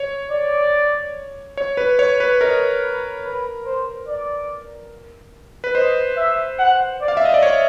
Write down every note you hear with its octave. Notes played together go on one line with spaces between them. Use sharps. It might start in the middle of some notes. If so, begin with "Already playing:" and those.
Already playing: C#5
D5
C#5
B4
C#5
B4
A#4 D#5
B4
B4
C5
D5
B4
C5 D#5
E5
F#5
D5
F5
E5
D#5
D5
C#5